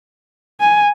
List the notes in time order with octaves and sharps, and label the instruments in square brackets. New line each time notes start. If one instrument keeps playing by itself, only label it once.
[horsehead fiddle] G#5